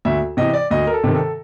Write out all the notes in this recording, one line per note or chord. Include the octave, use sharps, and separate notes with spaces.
D2 E5
C3 E3 D#5
D5
D2 D#5
A#4
A4
C3 D#3
A4